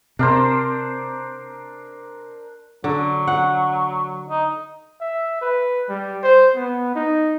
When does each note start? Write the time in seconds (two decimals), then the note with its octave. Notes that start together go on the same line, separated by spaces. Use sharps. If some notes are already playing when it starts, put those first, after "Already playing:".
0.19 C3 D4 A#4 C5
2.84 D3 F#3
3.27 F#5
4.29 D#4
5.01 E5
5.42 B4
5.89 G3
6.24 C5
6.56 B3
6.95 D#4